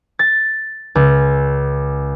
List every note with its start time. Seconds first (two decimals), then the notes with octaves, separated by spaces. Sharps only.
0.19 A6
0.95 C#2